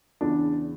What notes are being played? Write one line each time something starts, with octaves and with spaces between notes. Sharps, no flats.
E2 C#3 E3 D4